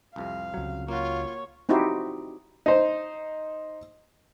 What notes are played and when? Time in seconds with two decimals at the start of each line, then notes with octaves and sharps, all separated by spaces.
0.16 C2 F2 C3 F5
0.54 C#2 F#3
0.88 A#3 F4 F#4 C#5
1.69 C4 D#4 E4 F#4 G4 C5
2.66 D#4 C5